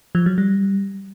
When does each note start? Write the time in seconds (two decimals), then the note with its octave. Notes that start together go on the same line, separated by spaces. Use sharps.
0.15 F3
0.26 F#3
0.38 G3